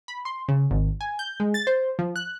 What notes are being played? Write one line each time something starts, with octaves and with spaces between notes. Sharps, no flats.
B5
C6
C#3
G#1
G#5
G6
G#3
A6
C5
F3
F#6